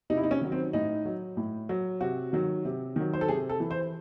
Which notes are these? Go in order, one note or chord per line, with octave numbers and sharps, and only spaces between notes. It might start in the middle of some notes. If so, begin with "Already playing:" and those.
C3 D#4
E4
D#4
C#4
D#3 F#3
C4
A2 D#4
F#3
A2
F#3
C3 F#4
D#3 F#3
C3
D#3 F#3
C5
A4
C3 G#4
A4
E3
C5